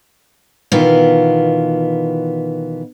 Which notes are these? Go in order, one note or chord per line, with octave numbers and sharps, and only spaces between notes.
B2 D#3 E3 B3 F4